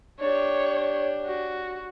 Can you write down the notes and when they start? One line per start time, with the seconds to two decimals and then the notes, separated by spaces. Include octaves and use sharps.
0.20 D4 G4 C#5
1.26 F#4